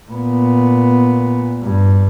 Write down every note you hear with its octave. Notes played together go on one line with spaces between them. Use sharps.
A#2 B3
G2